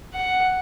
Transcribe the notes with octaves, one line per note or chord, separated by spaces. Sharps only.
F#5